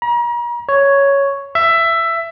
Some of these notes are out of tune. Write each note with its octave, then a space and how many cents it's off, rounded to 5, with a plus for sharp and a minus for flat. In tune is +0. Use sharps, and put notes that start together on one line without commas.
A#5 +40
C#5 +5
E5 +15